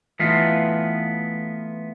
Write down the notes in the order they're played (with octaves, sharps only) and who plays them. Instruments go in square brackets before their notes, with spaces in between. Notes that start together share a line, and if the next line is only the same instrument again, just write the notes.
[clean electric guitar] E3 A3 B3 D#4 F4